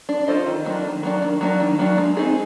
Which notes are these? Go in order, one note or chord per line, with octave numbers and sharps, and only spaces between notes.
D4
F4 A4 C5 D#5
D#3
F#3 A#3 D4
D#3
F#3 A#3 D4
D#3
F#3 A#3 D4
D#3
F#3 A#3 D4
G#3
C4 D#4 G#4